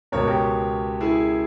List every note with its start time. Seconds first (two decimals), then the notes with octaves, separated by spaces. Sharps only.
0.12 C#2 B2 A#4 C#5
0.27 G4 A#4
1.01 E4 G#4